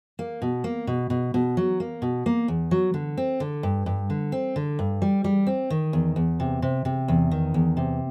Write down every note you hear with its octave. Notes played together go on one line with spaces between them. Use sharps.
A#3
B2
A#3
B2
B2
B2
F#3
A#3
B2
A#3
E2
F#3
D3
C4
D3
G2
G2
D3
C4
D3
G2
G3
G3
C4
D#3
E2
E2
C3
C3
C3
E2
D#3
E2
C3